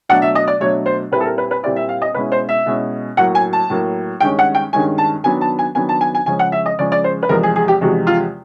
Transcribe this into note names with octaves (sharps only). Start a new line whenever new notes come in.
B2 F#3 A3 D4 F#5
E5
D#5
D5
B2 F#3 A3 D4 C#5
C5
A#2 G3 C4 E4 B4
A4
A#4
B4
B4
A#2 G3 C4 E4 D5
E5
F5
D#5
B2 G#3 C#4 E4 B4
C5
E5
B2 G#3 C#4 E4
A2 F#3 A#3 F#5
G#5
A5
A2 F#3 A#3
G2 D#3 G#3 C#4 G5
F#5
G5
G2 D#3 G#3 C#4 G#5
A5
D#3 F#3 B3 D4 G#5
A5
G#5
D#3 F#3 B3 D4 G#5
A5
G#5
G#5
C#3 F3 G#3 C#4 G#5
F#5
E5
D#5
C#3 F3 G#3 C#4 D5
D5
C5
B4
E2 C3 F3 G#3 A#4
G#4
G#4
G4
E2 C3 F3 G#3 F#4
F4